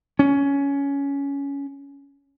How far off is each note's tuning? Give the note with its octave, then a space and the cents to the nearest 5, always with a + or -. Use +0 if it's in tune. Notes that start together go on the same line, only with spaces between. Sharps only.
C#4 +15